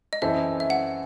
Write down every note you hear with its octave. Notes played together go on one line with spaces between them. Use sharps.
D#5
F#2 E3 C4 E4 A4 E5
E5
F#5